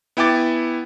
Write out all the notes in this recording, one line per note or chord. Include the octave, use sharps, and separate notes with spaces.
B3 E4 G5 G#5 D6 A6